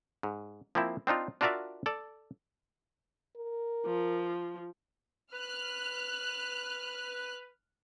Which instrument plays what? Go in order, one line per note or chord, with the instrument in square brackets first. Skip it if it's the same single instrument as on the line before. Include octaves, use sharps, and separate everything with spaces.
[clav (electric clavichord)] G#2
F3 A#3 C4 E4
C4 D4 D#4 F4
D4 F4 F#4 A#4 D5 E5
A4 D5
[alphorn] A#4
[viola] F3
[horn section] B4 [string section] F6 F#6